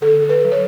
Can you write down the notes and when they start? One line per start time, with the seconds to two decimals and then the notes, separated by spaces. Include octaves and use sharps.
0.01 D3 A4
0.22 A4
0.29 B4
0.44 F#3
0.52 C#5